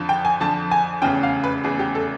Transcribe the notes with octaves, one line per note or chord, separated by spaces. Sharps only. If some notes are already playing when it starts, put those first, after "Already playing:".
Already playing: F2 D3 F3
G5
G#5
F2 D3 F3 A5
G#5
F1 E2 C#3 G5
F5
B4
F1 E2 C#3 G#4
G4
A4